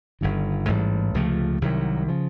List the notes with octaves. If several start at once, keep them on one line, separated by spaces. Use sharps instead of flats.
G1 G2 D#3
A1 G#2 E3 G3
C#2 C3 F3 A3
C2 C3 D#3 F#3
C#3 F3